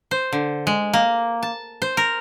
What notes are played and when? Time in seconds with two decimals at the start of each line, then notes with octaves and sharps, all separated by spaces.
0.11 C5
0.32 D3
0.67 G#3
0.93 A#3
1.43 A5
1.82 C5
1.97 A#4